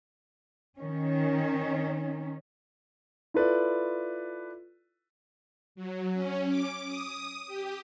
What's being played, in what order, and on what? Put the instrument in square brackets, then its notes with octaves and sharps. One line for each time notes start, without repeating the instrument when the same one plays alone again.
[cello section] D#3 C#4
[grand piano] E4 F4 A4 B4 D5
[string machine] F#3
C#4
D6
D#6
G4